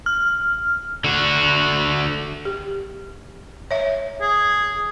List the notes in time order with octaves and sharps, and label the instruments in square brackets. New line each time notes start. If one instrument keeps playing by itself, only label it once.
[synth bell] F6
[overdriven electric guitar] D3 F#4
[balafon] G4
C#5 E5
[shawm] G#4